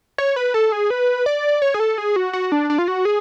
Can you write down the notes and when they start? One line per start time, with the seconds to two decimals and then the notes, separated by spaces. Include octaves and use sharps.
0.18 C#5
0.36 B4
0.54 A4
0.72 G#4
0.90 B4
1.26 D5
1.62 C#5
1.74 G#4
1.80 A4
1.98 G#4
2.16 F#4
2.33 F#4
2.52 D4
2.70 D4
2.78 F4
2.88 F#4
3.05 G#4